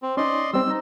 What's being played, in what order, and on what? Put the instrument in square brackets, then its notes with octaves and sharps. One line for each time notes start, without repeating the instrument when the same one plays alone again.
[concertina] C4
[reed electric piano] C#4 D#4 [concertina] D5 D#5 C6
[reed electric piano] G3 C4 [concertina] E6
[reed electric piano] D#4 A#5